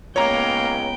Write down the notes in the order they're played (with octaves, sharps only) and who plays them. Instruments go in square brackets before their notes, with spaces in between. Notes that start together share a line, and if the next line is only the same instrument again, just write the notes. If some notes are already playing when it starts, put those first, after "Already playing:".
[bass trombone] C#2 [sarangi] A#3 [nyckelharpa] B3 G5 [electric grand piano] C#5 A#5